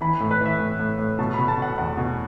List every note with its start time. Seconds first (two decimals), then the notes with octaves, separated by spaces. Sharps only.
0.01 E3 B5
0.20 A2
0.31 B4
0.40 E3
0.46 E5
0.59 A2
0.79 A2
0.99 A2
1.19 B2 A5
1.34 B2 B5
1.48 A5
1.57 B2 F#5
1.78 E2 F#5
1.97 B2